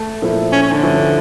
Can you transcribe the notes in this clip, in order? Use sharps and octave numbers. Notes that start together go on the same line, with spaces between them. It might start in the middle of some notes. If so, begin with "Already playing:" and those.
Already playing: A3
A#2 F3 A#3 E4 A4
C#4
C#4
D3
G2 F3 C#4 E4 A4